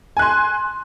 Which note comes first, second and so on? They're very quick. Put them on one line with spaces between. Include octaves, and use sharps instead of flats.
G#5 F#6 C6